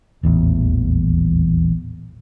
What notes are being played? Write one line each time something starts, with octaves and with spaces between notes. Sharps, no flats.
D#1 A1 E2